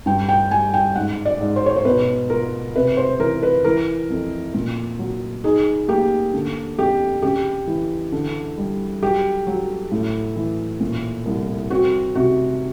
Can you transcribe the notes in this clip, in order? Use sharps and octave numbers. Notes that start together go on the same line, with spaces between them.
G2 G5
G5
G3 G#5
G5
G#2 F#5
D5
G#2
C5
C#5
C5
B2 B4
F4 A#4
C3 B4
C5
E3 A#4
B4
E3 A#4
F2
A#2
F#3
D#4 G#4
A#3 G4
D3
F2 G4
C#3 G4
E3
D3
G3
F#3 G4
F#3
A2
E3
A#2
C2
C4 F#4
C3 F#4